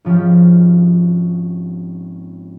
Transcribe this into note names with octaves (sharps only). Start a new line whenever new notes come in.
G#1 F3 C#4 G4